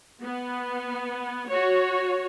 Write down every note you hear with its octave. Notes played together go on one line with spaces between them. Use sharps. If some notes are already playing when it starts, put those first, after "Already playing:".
B3
F#4 C#5